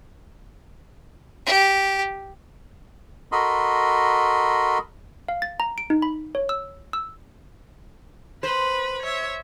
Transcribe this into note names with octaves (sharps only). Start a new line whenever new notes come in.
G4
F#4 A4 A#4 D#5 B5 C6
F5
A6
A#5
D7
D#4
B5
C#5
E6
E6
B4 C5 B5
C#5 E5